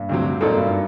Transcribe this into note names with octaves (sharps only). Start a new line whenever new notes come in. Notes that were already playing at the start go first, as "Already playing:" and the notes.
Already playing: G2
D2 C3 F#3 C4
F#2 A#2 A3 C4 D#4 A4
G2